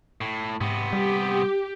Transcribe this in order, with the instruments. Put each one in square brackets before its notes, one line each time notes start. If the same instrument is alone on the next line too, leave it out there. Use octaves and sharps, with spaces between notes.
[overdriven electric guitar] A2
[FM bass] G#2 [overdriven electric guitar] C3 B3
[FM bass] G3 [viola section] G4